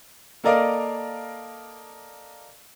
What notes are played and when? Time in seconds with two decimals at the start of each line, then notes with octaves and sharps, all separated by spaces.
0.44 A#3 A4 A#4 D5 D#5 F5